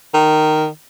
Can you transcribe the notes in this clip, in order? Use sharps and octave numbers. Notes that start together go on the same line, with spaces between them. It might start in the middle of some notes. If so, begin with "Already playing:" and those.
D#3